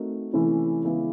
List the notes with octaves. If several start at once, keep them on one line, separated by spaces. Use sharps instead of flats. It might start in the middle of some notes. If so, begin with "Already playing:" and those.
Already playing: A3 C4 D#4 F#4 A#4
C3 E3 A3 C#4 E4
C#3 E3 G#3 B3 E4